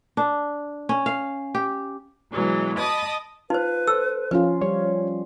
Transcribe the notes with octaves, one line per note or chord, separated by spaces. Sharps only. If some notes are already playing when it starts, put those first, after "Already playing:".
D4
C#4
F5
G4
B2 E3 F#3 G#3
D#5 A5 B5 D6 D#6
D#4 F4 B4 C5
A4 C5 E6
F3 C#4 F4 B4
G3 C#4 C#5